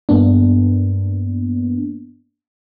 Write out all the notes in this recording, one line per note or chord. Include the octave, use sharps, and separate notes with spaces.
G2 A#3 B3 D4